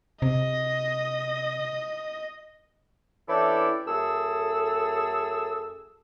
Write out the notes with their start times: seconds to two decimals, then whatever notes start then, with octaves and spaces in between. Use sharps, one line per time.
0.22 C3 D#5
3.29 E3 C#4 D4 E4 G4 A4
3.87 F#2 A3 G#4 A4 E6